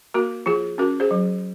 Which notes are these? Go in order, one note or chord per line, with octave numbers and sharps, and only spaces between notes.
A#3 F#4 A#4
F3 F4 G#4
C#4 F#4 A#4
G#4 C5
F#3